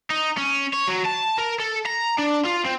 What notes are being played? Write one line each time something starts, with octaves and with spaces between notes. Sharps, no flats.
D#4
C#4
C#5
F#3
A5
A#4
A4
A#5
D4
F4
C4